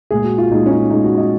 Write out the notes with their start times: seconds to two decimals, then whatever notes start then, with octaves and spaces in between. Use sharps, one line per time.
0.11 A#2 G#3 G#4
0.24 F#4
0.38 F4
0.51 A#2 G#3 D#4
0.66 C#4
0.71 D#4
0.90 A#2 G#3 D#4
1.04 F#4
1.18 D#5